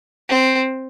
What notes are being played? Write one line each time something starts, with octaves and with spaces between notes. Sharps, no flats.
C4